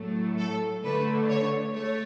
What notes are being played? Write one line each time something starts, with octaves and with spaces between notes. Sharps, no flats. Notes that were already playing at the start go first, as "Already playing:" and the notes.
Already playing: A2 F#3 A3
A4
D3 A3 B4
C#5
A3 C#5